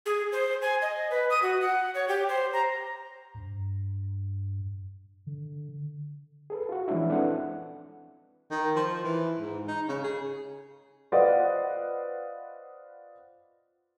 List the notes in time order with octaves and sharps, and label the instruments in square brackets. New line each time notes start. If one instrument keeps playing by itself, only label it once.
[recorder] G#4
C5
G#5
D#5
B4
D#6
F#4
F#5
C#5
G4
C5
A#5
[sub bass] G2
D3
[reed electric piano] G#4 A4 B4
F4 F#4
E3 F3 G#3 C#4 D4 E4
C4 D4 E4 A4 B4 F#5
[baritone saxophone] D#3
F3
E3
G#2
D#4
C#3
G#4
[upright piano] F4 B4 C5 D5 D#5 F#5